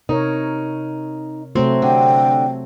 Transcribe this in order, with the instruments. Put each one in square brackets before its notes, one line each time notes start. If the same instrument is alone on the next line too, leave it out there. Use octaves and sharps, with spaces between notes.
[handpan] C3 A#4 C#5 [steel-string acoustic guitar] D#4
[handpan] C3 A3 [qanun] F#3 C4
[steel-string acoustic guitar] D3 [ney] G5